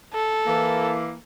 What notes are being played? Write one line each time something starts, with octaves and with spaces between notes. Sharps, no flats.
A4
E3 A#3